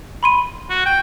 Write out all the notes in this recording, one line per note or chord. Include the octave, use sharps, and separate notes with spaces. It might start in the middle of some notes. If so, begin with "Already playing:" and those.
B5 C6 D#7
F#4
G5